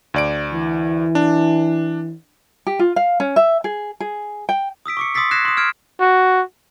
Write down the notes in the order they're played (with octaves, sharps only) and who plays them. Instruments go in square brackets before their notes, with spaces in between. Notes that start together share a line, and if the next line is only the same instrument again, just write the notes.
[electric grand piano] D2 D5 D7
[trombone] E3
[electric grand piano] D4
[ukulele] G4
F4
F5
C#4
E5
G#4
G#4
G5
[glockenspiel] D#6 E6 B6 D7
C#6 D6 C#7
C6 D#6 E6 A6 B6 C7
F#6 G#6 A#6 C7 E7
C6 D#6
F6 G#6 D7
[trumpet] F#4